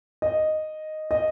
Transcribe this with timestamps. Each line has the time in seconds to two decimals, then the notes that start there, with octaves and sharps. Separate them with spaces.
0.22 D#5
1.11 D#5